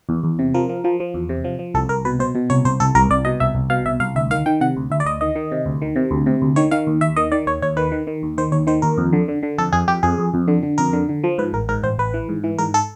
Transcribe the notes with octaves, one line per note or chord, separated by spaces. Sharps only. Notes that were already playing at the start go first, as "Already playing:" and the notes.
E2
E2
C3
F3 A#4
F3
F3
F3
E2
C3
F3
F3
C2 A4
C2 A#4
B2 B4
B2 C5
B2
C2 C#5
C2 C5
C2 A4
C2 A#4
C2 D5
B2 D#5
C2 E5
C2
B2 F5
C2 E5
C2 F5
D2 E5
D#3 F5
D#3 G5
C3 F#5
D2
D2 E5
D5
D2 D#5
D#3 D#5
D#3
C3
D2
D#3
C3
D2
C3
D2
D#3 C#5
D#3 F5
D#2
D#2 E5
D#3 D#5
D#3 D5
D#2 C#5
D#2 C#5
D#3 B4
D#3
D#3
D#2
D#3 C5
D#2 C#5
D#3 C5
D#2 A#4
F2
D3
D3
D3
F2 A4
F2 G#4
F2 G4
F2 G#4
F2
F2
D3
D3
F2 A#4
D3
D3
F3
G#2 B4
A1 A#4
G#2 A#4
A1 C5
A1 B4
E3
G#2
E3
G#2 A#4
A4